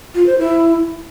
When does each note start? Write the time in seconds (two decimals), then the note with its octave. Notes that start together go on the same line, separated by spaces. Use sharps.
0.15 F4
0.27 C5
0.39 E4